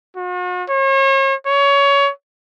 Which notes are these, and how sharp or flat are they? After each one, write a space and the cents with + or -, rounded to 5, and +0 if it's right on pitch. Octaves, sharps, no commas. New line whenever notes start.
F#4 -45
C#5 -40
C#5 +20